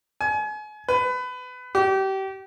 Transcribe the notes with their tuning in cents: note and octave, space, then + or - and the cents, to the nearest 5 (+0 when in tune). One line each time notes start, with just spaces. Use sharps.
G#5 +35
B4 +25
G4 -30